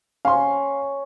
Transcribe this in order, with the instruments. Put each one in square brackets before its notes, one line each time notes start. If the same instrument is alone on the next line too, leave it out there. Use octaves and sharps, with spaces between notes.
[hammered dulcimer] C#4 [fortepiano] F5 C6